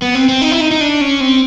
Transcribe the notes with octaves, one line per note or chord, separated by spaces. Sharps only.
B3
C4
C4
D#4
E4
D#4
D#4
D4
C#4
C4